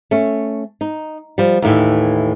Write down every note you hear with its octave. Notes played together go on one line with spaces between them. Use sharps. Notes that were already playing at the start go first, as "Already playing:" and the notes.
A3 C#4
D#4
F3 G3
D#2 A2 E3